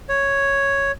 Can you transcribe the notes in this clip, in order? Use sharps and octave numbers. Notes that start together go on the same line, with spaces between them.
C#5